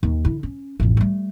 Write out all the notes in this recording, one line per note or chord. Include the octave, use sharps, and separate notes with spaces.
D#2
D3 E4
C#4
A1 F2
G3 A3